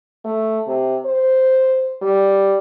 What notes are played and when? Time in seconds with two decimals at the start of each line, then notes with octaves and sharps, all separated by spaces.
0.25 A3
0.67 C3
1.05 C5
2.02 G3